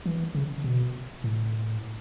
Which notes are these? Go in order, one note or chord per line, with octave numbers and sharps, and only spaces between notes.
E3
C#3
B2
A2